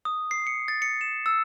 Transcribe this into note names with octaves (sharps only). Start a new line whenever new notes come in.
D#6
C7
C#7
A6
C#7
E7
E6